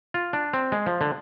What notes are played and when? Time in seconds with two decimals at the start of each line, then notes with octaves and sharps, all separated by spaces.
0.14 F4
0.33 D4
0.53 C4
0.72 G#3
0.86 F3
1.01 D3